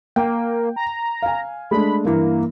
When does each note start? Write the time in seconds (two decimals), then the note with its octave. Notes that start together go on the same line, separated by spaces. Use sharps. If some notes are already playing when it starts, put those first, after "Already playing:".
0.16 A#3 G5
0.76 A#5
1.22 F5 G#5
1.71 G#3 A3 D4 B5
2.05 G2 E3 A#3